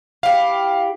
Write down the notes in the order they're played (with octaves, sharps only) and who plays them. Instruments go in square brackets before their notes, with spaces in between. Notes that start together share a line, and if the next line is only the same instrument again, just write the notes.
[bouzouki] E4 G4 [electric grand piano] F5